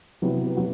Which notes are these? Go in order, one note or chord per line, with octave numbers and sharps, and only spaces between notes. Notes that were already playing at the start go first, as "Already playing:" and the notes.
C3 F#3 B3 E4 G4
B2 F#3 B3 F#4